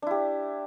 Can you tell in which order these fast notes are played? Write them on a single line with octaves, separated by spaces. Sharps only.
D4 E4 G4